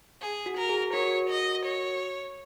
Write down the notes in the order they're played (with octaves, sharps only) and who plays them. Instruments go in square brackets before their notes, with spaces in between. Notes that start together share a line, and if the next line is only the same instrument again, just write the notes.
[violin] G#4
[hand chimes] F#4
[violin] A#4
[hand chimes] G#4
[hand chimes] F#4 A#4 [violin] C#5
[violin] D#5
C#5